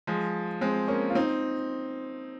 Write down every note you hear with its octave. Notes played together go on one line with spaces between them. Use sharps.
F3 G#3
G#3 C4
A#3 C#4
F4
C4 D#4